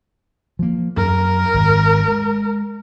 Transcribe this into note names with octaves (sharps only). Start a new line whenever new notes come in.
F3 A#3
F#2 A#4
G#1
G#3